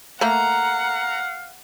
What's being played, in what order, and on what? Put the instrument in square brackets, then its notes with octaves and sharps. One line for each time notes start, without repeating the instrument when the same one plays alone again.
[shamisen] A3 A#3 [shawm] F5 [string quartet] F#5 [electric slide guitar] A#5